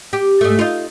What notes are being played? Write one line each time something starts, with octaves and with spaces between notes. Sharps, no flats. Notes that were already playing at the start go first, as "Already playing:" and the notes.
G4
G#2 A3
D#4 F4